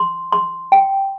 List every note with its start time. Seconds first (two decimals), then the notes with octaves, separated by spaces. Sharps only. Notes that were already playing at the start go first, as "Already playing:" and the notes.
Already playing: C6
0.33 C6
0.72 G5